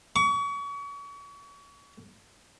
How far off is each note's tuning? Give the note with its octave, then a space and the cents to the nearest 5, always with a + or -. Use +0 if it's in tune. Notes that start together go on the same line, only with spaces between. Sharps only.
C#6 +35